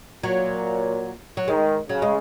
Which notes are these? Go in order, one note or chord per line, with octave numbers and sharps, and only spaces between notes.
A#2 F#3
F#3
D#3 G#3
C#3 F#3
G#3